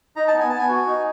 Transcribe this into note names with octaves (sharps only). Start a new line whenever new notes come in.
D#4 A#5
A5
B3
G#5
B3 A5
G#5
F#4
D#4